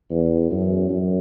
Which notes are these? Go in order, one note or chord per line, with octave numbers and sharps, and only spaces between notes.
E2
F#2
F#2